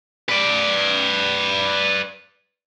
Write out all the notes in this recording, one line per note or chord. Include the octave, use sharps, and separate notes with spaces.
B4 D5